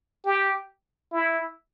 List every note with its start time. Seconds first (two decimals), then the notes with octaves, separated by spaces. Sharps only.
0.26 G4
1.12 E4